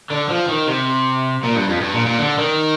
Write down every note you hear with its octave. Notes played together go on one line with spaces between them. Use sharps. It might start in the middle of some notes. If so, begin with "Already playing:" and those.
D3
F3
D#3
C3
A#2
G2
F2
G2
A#2
A#2
D3
D#3